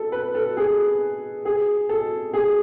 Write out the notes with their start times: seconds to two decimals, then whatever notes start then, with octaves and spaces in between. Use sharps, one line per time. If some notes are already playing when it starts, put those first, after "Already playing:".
Already playing: A4
0.12 B4
0.35 A4
0.57 G#4
1.45 G#4
1.89 A4
2.33 G#4